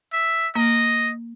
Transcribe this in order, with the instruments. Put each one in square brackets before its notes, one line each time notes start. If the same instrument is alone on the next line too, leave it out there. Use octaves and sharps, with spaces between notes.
[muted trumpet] E5
[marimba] A#3 [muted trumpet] D#5